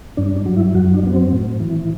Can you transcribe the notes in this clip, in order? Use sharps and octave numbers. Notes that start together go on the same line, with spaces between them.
G2 D4
D4
F#3
E4
F#2 F#4
D4
F#3 B3
C4
A2
E3